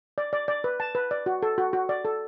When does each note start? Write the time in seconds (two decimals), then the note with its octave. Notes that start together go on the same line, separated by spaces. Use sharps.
0.18 D5
0.33 D5
0.48 D5
0.64 B4
0.80 A5
0.95 B4
1.11 D5
1.26 F#4
1.43 A4
1.58 F#4
1.73 F#4
1.89 D5
2.05 A4